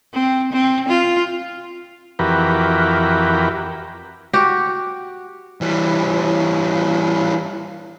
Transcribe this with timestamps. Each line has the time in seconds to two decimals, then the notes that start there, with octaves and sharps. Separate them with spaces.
0.13 C4
0.53 C4
0.88 F4
2.19 F2 E3 F#4 G4 A#4 B4
4.33 F#4 G4
5.61 E3 G3